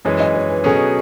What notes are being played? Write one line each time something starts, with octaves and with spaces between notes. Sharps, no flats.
F#2 E3 G#3 C#5
D#5
C#5
B4
B2 F#3 C#4 G#4 A4